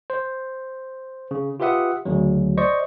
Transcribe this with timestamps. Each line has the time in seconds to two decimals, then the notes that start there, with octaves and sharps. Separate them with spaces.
0.10 C5
1.31 C#3
1.60 F4 G4 B4 E5 F#5 D#6
2.05 D2 C#3 F#3
2.57 C5 D5 D#5 C#6